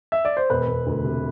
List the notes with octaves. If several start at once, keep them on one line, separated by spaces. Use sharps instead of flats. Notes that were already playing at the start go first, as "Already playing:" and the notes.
E5
D5
C5
E1 B4
E1
D2
C3